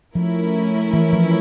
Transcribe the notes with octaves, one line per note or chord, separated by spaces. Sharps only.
F3 A3 C#4 E4 A#4
E3
F3